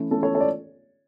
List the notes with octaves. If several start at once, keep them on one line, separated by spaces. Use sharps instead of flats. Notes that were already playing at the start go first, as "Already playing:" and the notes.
Already playing: E3 A3 C#4 E4
E3 A3 C#4 E4 A4
A4 C#5
A4 C#5
D5